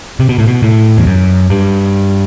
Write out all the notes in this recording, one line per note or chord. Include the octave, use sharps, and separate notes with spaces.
C3
B2
A2
B2
A2
E2
F#2
G2